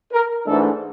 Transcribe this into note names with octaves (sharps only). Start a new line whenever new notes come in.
A#4
G#2 E3 A3 D4 A4